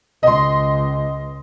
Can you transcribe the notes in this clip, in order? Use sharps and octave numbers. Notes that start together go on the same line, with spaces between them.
C#2 D#5 C6